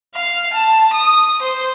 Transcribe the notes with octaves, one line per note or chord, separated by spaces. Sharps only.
F5
A5
D#6
C5